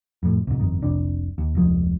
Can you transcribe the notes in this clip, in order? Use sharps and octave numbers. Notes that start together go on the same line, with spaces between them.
F2 A2
C2 G#2
G1 F2 D#3
F1 C2 D4
D#2
F1 D2 F3 G#3